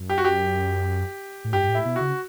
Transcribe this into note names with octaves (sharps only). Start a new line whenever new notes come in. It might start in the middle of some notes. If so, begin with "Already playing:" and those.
Already playing: F#2
G4
F#4
G4
A2
G2 G4
G2
A2
E4
B2
C#3 F#4